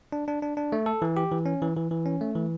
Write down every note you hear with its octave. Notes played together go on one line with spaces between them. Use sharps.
D4
D4
D4
D4
A3
A4
E3
G4
E3
C#4
E3
E3
E3
C#4
A3
E3